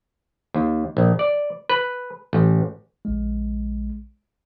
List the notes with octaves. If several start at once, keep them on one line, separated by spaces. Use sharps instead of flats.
D#2
A#1
D5
B4
A1
A#1 G#3